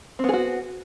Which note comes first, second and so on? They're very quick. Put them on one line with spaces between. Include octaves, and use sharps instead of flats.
C4 B3 G#4 F#4